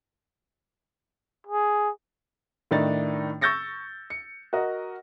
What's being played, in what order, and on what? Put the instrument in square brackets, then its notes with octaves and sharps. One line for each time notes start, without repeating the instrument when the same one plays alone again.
[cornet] G#4
[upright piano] A2 D#3 D4 D#4 A6
C#6 E6 G6 A6 A#6 C#7
C#7
F#4 A#4 D#5